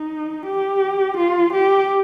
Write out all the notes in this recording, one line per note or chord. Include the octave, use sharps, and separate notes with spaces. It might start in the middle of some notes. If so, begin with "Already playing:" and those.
Already playing: D#4
G4
F4
G4